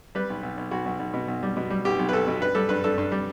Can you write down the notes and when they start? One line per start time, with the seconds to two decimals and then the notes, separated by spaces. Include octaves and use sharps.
0.15 G3 B4
0.30 B1
0.43 B1
0.57 B1
0.71 B1 F#4
0.86 B1
0.99 B1
1.14 B2
1.28 B1
1.43 G3
1.57 B2
1.70 G3
1.85 B1 G4
1.99 B1
2.09 B4
2.13 B1 A4
2.28 B2
2.41 G2 B4
2.55 G3 A4
2.69 G2 B4
2.84 G2 A4
2.98 G2
3.12 G3